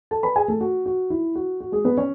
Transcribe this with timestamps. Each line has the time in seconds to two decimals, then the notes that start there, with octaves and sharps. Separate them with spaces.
0.11 A4 A5
0.23 B4 B5
0.36 G#4 G#5
0.48 A3 A4
0.61 F#4
0.86 F#4
1.10 E4
1.35 F#4
1.60 F#4
1.72 G#3 G#4
1.85 B3 B4
1.97 C#4 C#5